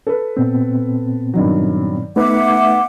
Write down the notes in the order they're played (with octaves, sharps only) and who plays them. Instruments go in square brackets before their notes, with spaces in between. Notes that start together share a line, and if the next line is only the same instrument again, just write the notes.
[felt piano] A4 B4
[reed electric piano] A#2 B3 C4
[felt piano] G2 D#3 F#3
[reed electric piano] A3 D#4 B4 [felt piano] B3 [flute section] E5 F#5 D6